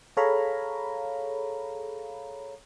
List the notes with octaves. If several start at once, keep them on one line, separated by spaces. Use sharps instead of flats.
G#4 A4 C#5 F5 A#5 B5